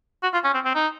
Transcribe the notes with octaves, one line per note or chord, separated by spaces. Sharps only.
F#4
F4
C#4
C4
C4
D#4